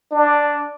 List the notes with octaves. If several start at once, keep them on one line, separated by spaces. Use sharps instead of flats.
D4